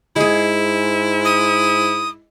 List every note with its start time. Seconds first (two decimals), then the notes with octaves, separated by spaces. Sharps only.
0.16 G#2 G#3 E4 G#4
1.25 D#6